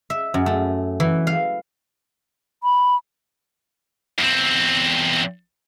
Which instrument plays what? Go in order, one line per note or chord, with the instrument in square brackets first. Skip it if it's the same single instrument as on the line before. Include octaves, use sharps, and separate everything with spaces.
[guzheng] E5
F#2
A3
E3
F5
[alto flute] B5
[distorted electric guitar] E2 C4